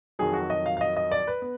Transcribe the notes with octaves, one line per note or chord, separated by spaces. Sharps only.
F2 D#3 F#3 G#4
F#4
D#5
F5
F5
D#5
D#5
D5
B4
B3